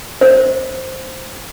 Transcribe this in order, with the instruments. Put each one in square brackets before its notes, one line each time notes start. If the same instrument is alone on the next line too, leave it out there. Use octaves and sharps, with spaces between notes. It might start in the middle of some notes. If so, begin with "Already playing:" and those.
[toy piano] C5